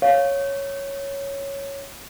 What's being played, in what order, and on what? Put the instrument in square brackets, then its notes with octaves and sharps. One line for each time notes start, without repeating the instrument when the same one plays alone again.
[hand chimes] C#5 [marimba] F5